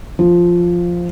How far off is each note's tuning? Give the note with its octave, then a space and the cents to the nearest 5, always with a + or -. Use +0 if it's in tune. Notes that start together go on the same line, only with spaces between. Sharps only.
F3 +0